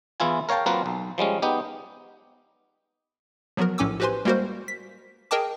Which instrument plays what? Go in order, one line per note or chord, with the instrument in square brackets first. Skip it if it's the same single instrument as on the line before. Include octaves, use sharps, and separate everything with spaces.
[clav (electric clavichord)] E2 E3 E4 F4 G#5
A#4 C#5 F5 G5 A5
F#3 A#3 C4 F4 A#4 B4
B1
F3 G3 G#3 C#4
B3 D#4 G4
[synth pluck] F3 F#3 B3 F#4 A#4
A#1 A2 C#4 G#5 D6 E6
F#4 G4 B4 C5 G#5 C6
G3 G#3 A#3 F#4 A#4 C5
B6
G#4 A#4 D#5 G5 A5 D6